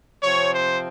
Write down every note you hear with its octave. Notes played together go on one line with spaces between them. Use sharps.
C3 F3 C4 C#5
C5